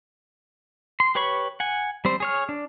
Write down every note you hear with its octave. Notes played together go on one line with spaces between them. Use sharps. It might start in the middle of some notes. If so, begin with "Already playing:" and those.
C6
G4 B4 C#5 B5 C#6
F#5 G#5
G3 C4 C5
G#4 C#5 F6
D4